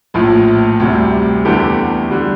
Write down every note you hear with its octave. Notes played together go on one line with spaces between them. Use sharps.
A#1 A2 F3
D2 C3 G3
E2 D3 A3 E4 G4
D3 G3